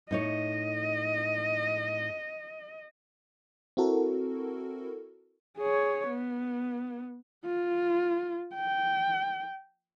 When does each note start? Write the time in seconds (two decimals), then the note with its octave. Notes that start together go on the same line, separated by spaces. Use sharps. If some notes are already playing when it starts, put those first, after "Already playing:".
0.11 A2 D#4 C#5 D#5
3.77 C4 E4 F#4 A4 A#4
5.58 G#4 C#5
6.09 B3
7.46 F4
8.55 G5